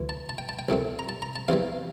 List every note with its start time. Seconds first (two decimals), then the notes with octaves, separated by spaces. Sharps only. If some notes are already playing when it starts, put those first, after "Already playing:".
Already playing: D2 E3
0.09 A5
0.29 A5
0.38 G5
0.49 A5
0.59 G5
0.69 C2 A#2 A3 C4
0.99 A#5
1.09 A5
1.22 A#5
1.36 A5
1.48 E2 C3 E3 G3 F5